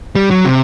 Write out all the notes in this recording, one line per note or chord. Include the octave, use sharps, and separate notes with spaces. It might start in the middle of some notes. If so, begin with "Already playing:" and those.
G3
F#3
C3